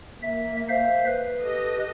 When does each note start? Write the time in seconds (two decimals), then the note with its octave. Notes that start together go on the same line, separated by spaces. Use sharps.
0.23 A#3 E5
0.69 C5 E5 F5
1.07 B4
1.41 G4 A4 D#5